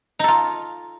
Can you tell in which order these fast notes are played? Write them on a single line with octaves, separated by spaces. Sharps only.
D#4 A4 F4